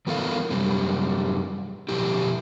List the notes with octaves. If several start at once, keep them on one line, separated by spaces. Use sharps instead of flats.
E3 B3 E4 A4 A#4 F5
F#2 C3 G3
F2 B2 E4 G4